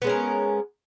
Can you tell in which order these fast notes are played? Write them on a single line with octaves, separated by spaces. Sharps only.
B3 G#3 C#4 A#4